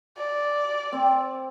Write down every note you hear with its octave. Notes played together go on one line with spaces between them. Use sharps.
D5
C4